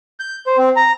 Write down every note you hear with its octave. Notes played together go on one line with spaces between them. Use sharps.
G6
C5
C4
A#5